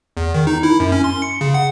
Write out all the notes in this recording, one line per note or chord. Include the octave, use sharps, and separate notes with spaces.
E2
D#3
D#4
E4
F#2
C#4
C6
C#7
C#3
F#5